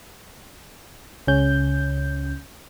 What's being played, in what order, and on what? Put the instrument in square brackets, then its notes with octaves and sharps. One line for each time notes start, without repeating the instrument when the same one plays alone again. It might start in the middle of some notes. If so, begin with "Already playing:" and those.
[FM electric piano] C#2 C#3 C#4 G6